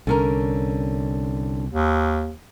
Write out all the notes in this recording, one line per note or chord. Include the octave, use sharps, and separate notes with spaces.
C2 D3 C#4 A#4
D#2